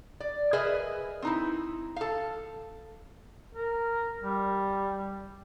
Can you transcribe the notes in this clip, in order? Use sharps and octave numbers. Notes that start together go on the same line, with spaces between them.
D5
G#4 A#4 B4 D#5 E5 G#5
C4 D#4 E4
A4 F5
A#4
G3